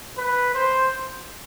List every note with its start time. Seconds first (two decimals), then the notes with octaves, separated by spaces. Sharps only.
0.17 B4
0.55 C5